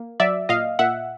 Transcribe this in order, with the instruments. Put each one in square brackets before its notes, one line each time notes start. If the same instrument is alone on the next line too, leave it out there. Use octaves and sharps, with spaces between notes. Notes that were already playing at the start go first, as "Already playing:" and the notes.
Already playing: [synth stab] A#3
F#3 D5 E5
A#2 D#5 F5
A#2 E5 F#5